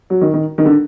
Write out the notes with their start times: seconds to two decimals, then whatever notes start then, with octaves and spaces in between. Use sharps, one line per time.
0.10 F#3
0.21 D#3
0.34 D#3
0.58 D#3
0.65 D3